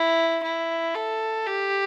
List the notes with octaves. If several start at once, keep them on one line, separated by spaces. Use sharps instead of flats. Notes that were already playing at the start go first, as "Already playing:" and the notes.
Already playing: E4
E4
A4
G4